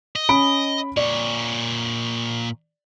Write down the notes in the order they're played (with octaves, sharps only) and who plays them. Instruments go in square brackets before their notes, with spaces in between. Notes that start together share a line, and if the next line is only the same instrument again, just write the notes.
[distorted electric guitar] D#5
[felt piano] C#4 B5 D7
[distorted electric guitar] A#2 C#5 [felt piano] D5